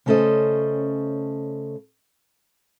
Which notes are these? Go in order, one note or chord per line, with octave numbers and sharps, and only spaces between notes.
C#3 A3 C#4 A4 C5 D#5